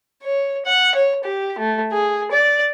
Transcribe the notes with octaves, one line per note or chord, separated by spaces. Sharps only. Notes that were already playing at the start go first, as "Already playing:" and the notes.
C#5
F#5
C#5
G4
A3
G#4
D5